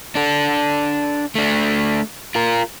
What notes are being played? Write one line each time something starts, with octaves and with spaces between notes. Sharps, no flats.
D4 A4
A3 D4
F4 A#4